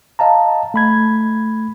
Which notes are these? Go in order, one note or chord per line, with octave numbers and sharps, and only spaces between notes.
D#5 F5 A5 A#5
A3 B5 G#6